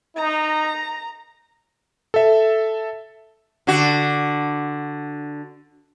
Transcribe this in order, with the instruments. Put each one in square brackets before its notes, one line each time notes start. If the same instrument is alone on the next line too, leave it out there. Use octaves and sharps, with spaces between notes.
[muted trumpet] D#4 [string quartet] A#5
[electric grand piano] A4 E5
[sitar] D3 F#4